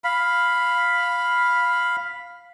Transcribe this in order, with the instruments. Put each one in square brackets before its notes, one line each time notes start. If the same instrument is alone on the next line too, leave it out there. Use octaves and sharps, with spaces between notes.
[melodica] F5 B5